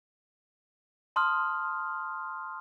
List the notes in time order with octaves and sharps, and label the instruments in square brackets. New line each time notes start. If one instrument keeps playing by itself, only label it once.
[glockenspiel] A5 C6 D#6 F6